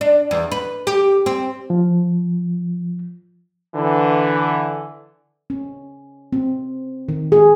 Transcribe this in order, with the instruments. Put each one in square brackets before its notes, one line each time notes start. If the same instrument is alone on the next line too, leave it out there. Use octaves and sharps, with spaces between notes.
[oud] D4
E2
B4
G4
C4
[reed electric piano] F3
[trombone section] D3 E3
[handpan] C#4
C4
D#3
G#4